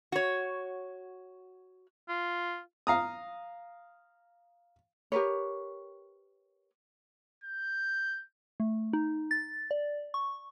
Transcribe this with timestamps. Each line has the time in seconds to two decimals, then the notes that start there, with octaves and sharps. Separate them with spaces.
0.12 F#4 C#5
2.09 F4
2.87 F5 A#5 D#6
5.12 G4 A#4 B4 C#5
7.44 G6
8.60 A3
8.93 D#4
9.31 A6
9.71 D5
10.14 C#6